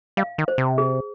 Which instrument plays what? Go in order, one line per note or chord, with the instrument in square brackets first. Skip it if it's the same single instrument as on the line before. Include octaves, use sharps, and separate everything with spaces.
[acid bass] G3 [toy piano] F5
[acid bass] D#3
[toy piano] C5
[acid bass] C3
[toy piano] G#4